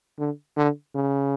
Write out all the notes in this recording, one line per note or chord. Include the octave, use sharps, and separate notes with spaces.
D3
D3
C#3